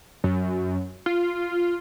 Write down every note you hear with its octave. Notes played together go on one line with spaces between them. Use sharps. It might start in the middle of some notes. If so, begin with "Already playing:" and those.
F#2
F4